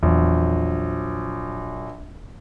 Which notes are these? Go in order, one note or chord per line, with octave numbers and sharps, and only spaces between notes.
A#1 E2 F#3